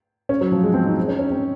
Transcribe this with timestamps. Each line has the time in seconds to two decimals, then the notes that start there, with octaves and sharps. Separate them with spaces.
0.29 C#4
0.41 F#3
0.52 F3
0.63 G#3
0.74 C4
0.86 D#4
1.08 C#4
1.19 C#4
1.31 C4